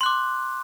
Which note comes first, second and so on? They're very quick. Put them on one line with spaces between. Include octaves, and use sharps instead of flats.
C6 F#6 D6